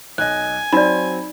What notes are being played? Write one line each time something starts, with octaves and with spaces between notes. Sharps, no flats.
B1 D#5 G#5 F#6
F#3 C4 D#4 D5 B5